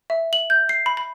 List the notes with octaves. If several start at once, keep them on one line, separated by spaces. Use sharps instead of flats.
E5
F#7
G6
C7
B5
B5